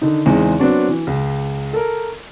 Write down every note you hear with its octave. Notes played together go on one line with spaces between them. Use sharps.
D3 D#3 D#4
E2 C#3 G#3 C4 D#4
F#3 B3 C4 D4 F#4
E3
C#2
A4 A#4